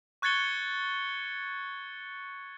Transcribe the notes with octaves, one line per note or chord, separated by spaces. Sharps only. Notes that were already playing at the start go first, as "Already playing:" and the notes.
C#6 F#6 G#6 A6 C#7 G7